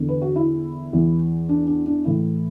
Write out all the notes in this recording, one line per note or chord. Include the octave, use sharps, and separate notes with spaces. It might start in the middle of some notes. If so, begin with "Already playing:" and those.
Already playing: E2 D3
B4
F#4
E4
E2 E3
D4
D4
D4
A2 E3 E4